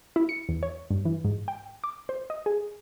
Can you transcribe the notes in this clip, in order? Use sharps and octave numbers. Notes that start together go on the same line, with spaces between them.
E4
C#7
E2
C#5
G2
E3
G#2
G5
D6
C5
D#5
G#4